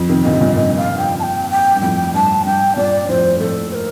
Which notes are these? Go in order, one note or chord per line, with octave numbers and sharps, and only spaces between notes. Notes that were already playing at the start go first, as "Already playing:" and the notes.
Already playing: F2
C3 D#3
A#2 D3 D#5
C3
G2 A#2
G2 A#2 D#5
F5
G5
A5
G5
G5
G2
F2 A2 G5
G2 A5
G2 G5
G2 A#2 D5
F2 A2 C5
F2 A2 A4
C5
A#4